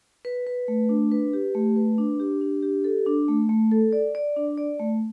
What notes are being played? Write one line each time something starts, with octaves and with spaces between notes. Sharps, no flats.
B4
B4
A3
D4
B4
G4
A3
B4
D4
G4
D4
G4
A4
D4
A3
A3
A4
D5
D5
D4
D5
A3